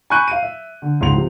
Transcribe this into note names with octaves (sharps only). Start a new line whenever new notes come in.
G#5 B5 C#6 F#6 G6 D#7
F5 D#7
E5
D3
C#2 G#2 C6 F7
C3 F3